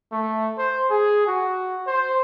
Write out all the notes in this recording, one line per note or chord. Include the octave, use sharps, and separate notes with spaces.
A3
C5
G#4
F#4
C5